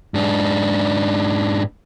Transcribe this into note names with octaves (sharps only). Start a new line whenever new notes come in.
G#2 D4